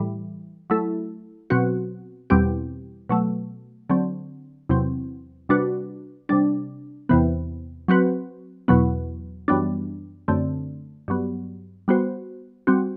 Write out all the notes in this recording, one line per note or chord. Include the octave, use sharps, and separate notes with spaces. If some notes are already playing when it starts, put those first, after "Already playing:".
Already playing: A2 E3 G3
F#3 A3 E4 A4
B2 F#3 C4 F#4
E2 B2 G3 C4 G4
B2 F#3 A3
D3 F#3 C4
E2 C3 F#3 C4
C3 G3 D4 F#4 B4
C3 G3 D4
E2 C3 E3 B3
F#3 C4 F#4 B4
E2 B2 F#3 B3
F#2 E3 G3 B3 D4
F#2 D3 A3 C4
G2 F#3 B3
G3 B3 F#4 C5
G3 C4 F#4